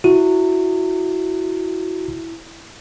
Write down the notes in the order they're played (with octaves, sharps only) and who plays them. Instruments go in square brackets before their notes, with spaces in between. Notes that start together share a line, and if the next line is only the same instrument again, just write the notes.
[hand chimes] E4 [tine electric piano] F#4